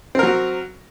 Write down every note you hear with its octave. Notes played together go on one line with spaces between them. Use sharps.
F#3 C4 A#4